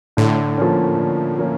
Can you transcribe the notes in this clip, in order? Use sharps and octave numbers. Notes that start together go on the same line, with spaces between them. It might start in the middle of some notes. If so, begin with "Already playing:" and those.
A2 D3
F3 A#3 C#4
D3
F3 A#3 C#4